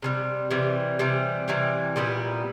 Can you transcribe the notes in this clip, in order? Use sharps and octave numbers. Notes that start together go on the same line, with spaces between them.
C3 E3 G3
C3 E3 G3
C3 E3 G3
C3 E3 G3
A#2 G3 B3 E4